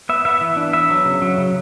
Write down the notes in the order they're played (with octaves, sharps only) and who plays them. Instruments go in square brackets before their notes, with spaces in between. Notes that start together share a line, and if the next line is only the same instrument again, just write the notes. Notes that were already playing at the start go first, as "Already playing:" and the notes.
[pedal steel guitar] B3 E5
B3 E5
E3
D4
B3 E5
F#3
C#3
F#3
C#3